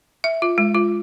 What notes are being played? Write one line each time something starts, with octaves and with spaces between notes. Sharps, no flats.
E5
F4
G#3
F4